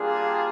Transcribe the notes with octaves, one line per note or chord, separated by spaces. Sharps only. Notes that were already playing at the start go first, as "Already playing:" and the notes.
Already playing: G3 A#3 D4 F4 G#4